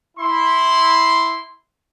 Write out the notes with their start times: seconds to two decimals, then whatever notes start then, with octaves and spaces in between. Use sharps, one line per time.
0.18 E4 C6